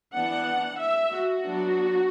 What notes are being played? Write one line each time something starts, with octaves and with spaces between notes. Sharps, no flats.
E3 B3 D4 F#5
E5
F#4
F#3 B3 D4